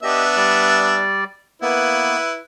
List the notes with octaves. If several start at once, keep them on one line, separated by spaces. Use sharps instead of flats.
B3 D4 G4 D#5 E5
G3 D5
A#3 B3 E4 B4